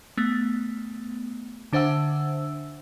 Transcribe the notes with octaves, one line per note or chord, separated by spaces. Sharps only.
A3 B3
D3 D4 C5 E5 F#5 E6